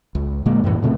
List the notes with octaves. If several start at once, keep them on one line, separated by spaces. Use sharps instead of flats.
C#2
A#2 D3 G#3 A#3
F#2 A2 E3
A#2 C#3 A3 C4